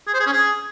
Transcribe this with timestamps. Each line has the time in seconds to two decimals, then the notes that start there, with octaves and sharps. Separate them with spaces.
0.07 G#4
0.14 C5
0.20 G#4
0.26 C#4
0.33 G#4